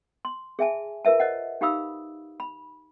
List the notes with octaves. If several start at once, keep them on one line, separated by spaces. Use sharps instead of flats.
C6
G#4 E5 G#5 A5
F4 A#4 B4 E5 A5
C5 D#5 F#5
D#4 G4 F5 B5 D#6 E6
B5